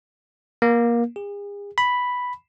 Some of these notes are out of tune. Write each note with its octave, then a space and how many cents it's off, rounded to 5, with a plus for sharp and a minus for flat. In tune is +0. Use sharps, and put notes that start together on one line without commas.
A#3 +20
G#4 -40
B5 +0